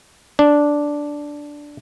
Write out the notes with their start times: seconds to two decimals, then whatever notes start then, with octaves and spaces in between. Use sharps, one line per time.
0.39 D4